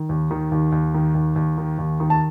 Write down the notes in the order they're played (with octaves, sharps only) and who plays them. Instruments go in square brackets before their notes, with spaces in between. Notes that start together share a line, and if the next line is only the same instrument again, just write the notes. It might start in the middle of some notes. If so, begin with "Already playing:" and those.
Already playing: [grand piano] D#3
D#2
D#3
D#2
D#2
D#3
D#2
D#2
D#3
D#2
D#3
A5